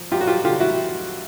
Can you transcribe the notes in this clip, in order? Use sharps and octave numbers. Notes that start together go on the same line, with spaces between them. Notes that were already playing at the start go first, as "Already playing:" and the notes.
Already playing: F3
F#2 F4 G4
F#4
F4 G4
D3 F4 G4
E4 F#4